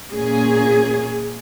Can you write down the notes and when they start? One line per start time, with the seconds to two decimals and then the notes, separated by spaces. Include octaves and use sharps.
0.12 A#2 A#3 C#4 G#4